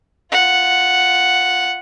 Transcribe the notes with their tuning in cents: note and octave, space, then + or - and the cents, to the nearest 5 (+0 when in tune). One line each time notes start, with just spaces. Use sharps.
F4 +0 F#5 +0